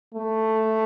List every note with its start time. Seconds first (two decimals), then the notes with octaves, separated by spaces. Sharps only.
0.14 A3